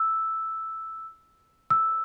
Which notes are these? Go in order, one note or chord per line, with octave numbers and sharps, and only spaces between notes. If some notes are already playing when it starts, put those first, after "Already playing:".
Already playing: E6
E6